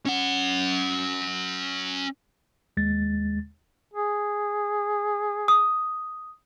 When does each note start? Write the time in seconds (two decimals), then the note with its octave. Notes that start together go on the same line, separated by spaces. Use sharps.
0.06 C#4 F#5
2.77 D#2 G#3 A6
3.93 G#4
5.48 D#6